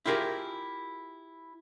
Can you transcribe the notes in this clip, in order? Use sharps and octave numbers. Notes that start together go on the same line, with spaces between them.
E4 F4 G4 G#4 A#4